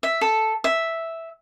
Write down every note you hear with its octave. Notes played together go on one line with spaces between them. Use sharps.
E5
A4
E5